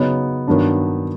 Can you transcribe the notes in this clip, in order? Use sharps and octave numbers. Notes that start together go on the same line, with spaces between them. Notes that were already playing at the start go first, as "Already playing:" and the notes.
Already playing: C#3 F#3 B3 D#4
G2 D#3 F#3 B3 D4